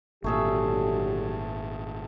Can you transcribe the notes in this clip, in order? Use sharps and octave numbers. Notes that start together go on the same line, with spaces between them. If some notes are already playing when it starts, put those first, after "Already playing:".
G#1 A#2 D3 F#3 A3 G4 G#4 E5